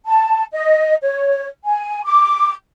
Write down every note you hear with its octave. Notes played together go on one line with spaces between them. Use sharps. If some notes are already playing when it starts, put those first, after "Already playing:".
A5
D#5
C#5
G#5
D6